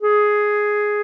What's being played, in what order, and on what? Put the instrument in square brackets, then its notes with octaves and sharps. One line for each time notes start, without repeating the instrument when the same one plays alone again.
[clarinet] G#4